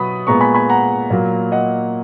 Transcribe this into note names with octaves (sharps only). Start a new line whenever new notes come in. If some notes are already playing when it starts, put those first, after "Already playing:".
Already playing: B2 F#3 B3 B5 D#6
A#2 G#3 B3 A#5 C#6
G#5 B5
G#5 B5
F#5 A#5
A#2 F#3 A#3
D#5 F#5